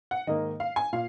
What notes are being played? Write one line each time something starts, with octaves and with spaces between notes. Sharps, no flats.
F#5
G#2 D#3 A#3 D#4 D#5
F5
G#5
A#2 F5